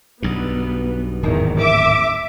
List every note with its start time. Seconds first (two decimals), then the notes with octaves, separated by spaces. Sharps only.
0.23 B1 G2 B3
1.23 D1 G#1 E2 G#2 D#3
1.59 E5 D6